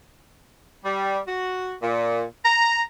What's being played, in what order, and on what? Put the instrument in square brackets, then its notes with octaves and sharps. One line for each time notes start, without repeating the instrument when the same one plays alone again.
[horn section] G3
F#4
A#2
A#5